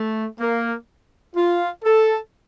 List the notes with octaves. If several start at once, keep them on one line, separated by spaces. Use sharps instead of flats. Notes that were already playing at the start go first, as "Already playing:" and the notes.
Already playing: A3
A#3
F4
A4